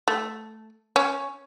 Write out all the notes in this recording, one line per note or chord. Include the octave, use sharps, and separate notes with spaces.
A3
C#4